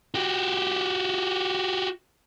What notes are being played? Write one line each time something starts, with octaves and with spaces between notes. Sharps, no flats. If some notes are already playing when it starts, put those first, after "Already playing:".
F#4 G4